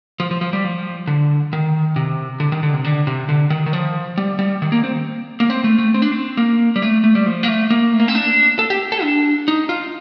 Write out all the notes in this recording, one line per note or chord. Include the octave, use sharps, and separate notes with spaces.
F3
F3
F3
G3
F3
D3
D#3
C3
D3
D#3
D3
C3
D3
C3
D3
D#3
D#3
F3
G3
G3
D#3
A#3
C4
A#3
C4
A3
A3
C4
D4
C4
A#3
G3
A3
A3
G3
F3
A#3
A3
A#3
A3
A#3
C4
D4
A4
G4
A4
D4
D#4
F4